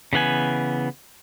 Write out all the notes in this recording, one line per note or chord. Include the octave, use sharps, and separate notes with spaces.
C#3 E3 B3 G#5